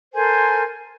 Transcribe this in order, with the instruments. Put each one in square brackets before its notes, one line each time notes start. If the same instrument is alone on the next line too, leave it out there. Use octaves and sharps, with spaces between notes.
[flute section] A4 A#4 C5 G#5